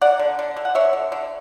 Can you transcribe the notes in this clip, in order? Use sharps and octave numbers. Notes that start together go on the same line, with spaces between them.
A#3 D5 F#5
D3
D3
D3
F#5
D3 C#5 E5
D3
D3